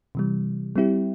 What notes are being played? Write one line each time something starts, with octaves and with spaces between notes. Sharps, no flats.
C3 E3 G3
G3 C4 E4 G4